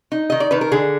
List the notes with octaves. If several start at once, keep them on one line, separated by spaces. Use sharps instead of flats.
D#4
D#3 D#5
D5
D#3 B4
A#4
D3 G#4